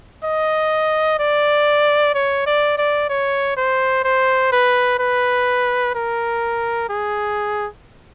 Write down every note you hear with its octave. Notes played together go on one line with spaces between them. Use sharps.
D#5
D5
C#5
D5
D5
C#5
C5
C5
B4
B4
A#4
G#4